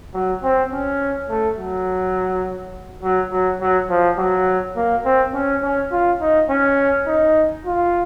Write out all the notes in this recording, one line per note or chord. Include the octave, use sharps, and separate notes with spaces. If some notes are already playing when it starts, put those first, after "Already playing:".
F#3
C4
C#4
A3
F#3
F#3
F#3
F#3
F3
F#3
A#3
C4
C#4
C#4
F4
D#4
C#4
D#4
F4